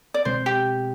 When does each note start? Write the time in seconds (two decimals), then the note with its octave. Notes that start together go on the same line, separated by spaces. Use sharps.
0.14 D5
0.25 B2 G#3 C4 C5
0.46 G4